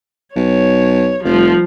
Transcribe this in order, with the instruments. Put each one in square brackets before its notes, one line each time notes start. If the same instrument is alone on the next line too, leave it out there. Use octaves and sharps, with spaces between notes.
[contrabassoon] B1 [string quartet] C#5
[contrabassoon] F1 [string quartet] F3 G3